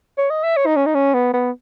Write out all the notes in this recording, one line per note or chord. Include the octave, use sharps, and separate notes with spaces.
C#5
D#5
E5
C#5
D#4
C#4
D#4
C#4
B3
B3